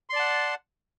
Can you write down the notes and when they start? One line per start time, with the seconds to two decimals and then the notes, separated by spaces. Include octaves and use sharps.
0.09 C6
0.13 D5
0.16 A5
0.19 F#5